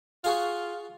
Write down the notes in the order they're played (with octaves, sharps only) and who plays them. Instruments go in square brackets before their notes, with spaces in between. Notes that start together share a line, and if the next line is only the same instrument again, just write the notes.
[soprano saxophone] F4 [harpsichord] F#4 G#4 F5